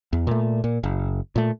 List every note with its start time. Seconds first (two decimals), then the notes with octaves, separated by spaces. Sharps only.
0.13 E2
0.27 A#2 A3
0.64 A#2
0.83 F#1
1.36 A#2 A3